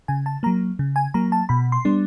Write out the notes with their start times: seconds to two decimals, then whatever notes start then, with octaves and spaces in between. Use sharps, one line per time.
0.08 C#3 G#5
0.26 A5
0.43 F#3 A#3 A#5
0.79 C#3
0.96 G#5
1.14 F#3 A#3 A#5
1.32 A5
1.49 B2 B5
1.72 C6
1.85 G3 B3 D4